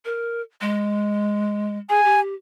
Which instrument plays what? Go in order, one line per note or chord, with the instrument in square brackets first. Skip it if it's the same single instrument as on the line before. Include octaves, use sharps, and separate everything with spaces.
[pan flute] A#4
G#3
[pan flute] G#4 [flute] G#5
[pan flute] G4